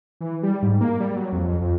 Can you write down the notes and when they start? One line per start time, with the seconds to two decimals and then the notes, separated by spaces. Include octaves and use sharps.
0.21 E3
0.43 G3
0.62 G#2
0.81 A#3
1.00 G3
1.16 F#3
1.33 F2
1.48 F2
1.62 F2